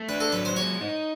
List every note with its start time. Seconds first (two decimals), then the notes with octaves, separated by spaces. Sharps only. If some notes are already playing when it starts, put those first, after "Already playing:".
Already playing: A3
0.09 D4 B4
0.20 A4
0.32 F#3 B4
0.45 C5
0.56 G#3 C#5
0.81 D#4